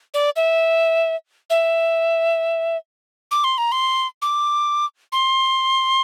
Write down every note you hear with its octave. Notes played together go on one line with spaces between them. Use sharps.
D5
E5
E5
D6
C6
A#5
C6
D6
C6